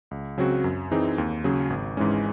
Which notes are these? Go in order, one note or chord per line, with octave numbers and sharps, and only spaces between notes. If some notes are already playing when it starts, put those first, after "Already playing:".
C#2
C#3 F#3 C4 F#4
F#2
E3 C4 D#4 G#4
D#2
C#3 F#3 C#4 G#4
G#1
G#2 E3 G#3 C#4